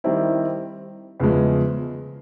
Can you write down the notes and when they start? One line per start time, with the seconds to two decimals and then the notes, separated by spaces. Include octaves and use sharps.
0.04 D#3 G3 C4 E4
1.20 E2 C#3 F3 G#3